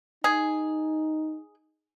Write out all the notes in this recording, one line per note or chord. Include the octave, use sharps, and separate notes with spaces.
D#4 G#4